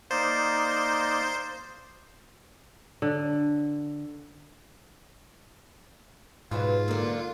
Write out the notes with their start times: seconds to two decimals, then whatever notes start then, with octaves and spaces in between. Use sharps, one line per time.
0.11 A#3 D#4 C5 D5
3.02 D3
6.51 G#2 B2 E3 F#3 F4
6.88 F#2 D3 A#3